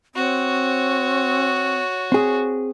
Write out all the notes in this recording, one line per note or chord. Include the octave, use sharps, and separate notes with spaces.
C4 F#4 C#5
C4 G#4